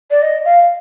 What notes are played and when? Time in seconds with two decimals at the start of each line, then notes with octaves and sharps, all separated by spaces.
0.11 D5
0.22 D#5
0.45 F5